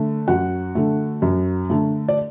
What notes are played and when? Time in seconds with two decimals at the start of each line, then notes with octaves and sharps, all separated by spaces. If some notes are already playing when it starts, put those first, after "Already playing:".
Already playing: D3 A3
0.28 F#2 F#4 F#5
0.75 D3 A3
1.22 F#2
1.70 D3 A3
2.09 D5